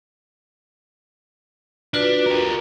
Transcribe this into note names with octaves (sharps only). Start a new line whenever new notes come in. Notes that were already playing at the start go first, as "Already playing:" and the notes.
D4 F4 F#4 B4
G4 A#4